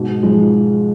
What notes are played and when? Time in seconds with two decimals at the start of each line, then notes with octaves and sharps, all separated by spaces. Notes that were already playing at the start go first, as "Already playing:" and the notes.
Already playing: G#2 B2
0.23 F3 G#3